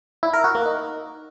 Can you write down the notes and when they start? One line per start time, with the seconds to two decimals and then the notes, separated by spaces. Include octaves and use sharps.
0.23 E4
0.34 A#4
0.44 F#4
0.55 A#3
0.65 D#4